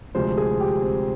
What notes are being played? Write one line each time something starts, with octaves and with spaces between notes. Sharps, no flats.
D2 C3 F3 G#3 C5
G#4
G4
C4